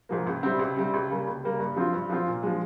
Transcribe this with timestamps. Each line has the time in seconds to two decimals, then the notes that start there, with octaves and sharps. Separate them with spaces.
0.09 G#2 F3 A#3
0.27 C#2
0.43 C3 G3 C4
0.59 C#2
0.77 C3 G3 C4
0.94 C#2
1.10 C#3 G3 A#3
1.27 C#2
1.44 C#3 G3 A#3
1.59 G2
1.76 F3 C4 F4
1.93 G2
2.09 F3 C4 F4
2.27 A#2
2.43 F3 G#3